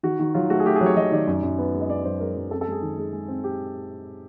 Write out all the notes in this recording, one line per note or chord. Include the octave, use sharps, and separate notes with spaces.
D#3 F#4
D#3
F#3 F4
A3 F#4
G#4
A3 G4
G#4
F#3
C#5
F#3 D#5
D#3 D5
F#2
F#2
B3
G#3
D#5
B3 D5
F#2 C5
G#3 A#4
F#2
C4 A4
A4
G#3 G#4
D#3
G#3
G#3
C4
G4